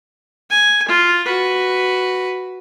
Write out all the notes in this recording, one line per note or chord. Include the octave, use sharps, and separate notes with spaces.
G#5
F4
F#4 B4